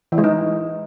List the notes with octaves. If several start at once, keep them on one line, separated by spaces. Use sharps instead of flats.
E3
G#3
D#4